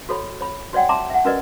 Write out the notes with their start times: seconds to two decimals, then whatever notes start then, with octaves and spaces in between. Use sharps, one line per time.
0.09 F#4 A4 C#5 B5
0.41 C#5 B5
0.73 F#4 C#5 D5 F#5 G5
0.89 E5 A5 A#5 C6 D6
1.10 E5 F#5
1.25 C#4 F#4 A#4 B4 D5 D#5